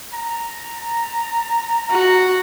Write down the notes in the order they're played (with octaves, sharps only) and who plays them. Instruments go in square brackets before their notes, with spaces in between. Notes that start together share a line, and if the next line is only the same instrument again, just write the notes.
[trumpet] A#5
[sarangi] F#4